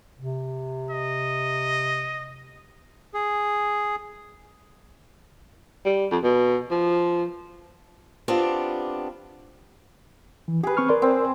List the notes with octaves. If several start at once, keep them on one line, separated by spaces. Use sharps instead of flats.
C3
D#5
G#4
G3
F2
B2
F3
B3 C4 D4 F4 G4
E3
G4 G#4 B4
C4 C#6 F6
A#4 D5 C6
C4